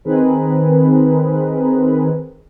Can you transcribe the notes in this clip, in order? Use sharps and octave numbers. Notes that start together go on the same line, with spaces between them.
D#3 C4 G#4 A#4 B4